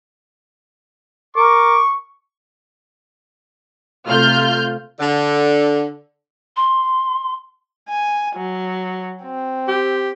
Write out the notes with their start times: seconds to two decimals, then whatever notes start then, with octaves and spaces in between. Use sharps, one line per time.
1.36 A#4 C#6 D6
4.07 C3 A3 F4 F6 G6
4.98 D3
6.56 C6
7.89 G#5
8.36 F#3
9.23 C4
9.68 G4